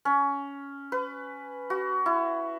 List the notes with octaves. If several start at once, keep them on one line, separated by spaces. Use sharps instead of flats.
C#4
B4
F#4
E4